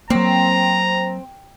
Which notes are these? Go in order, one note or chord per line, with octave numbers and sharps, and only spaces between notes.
F#3 A#3 C4 A#5